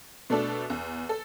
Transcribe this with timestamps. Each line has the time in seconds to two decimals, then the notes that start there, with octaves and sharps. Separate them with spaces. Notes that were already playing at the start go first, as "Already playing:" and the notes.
0.30 B2 A3 D4 A4
0.70 E2
1.09 A4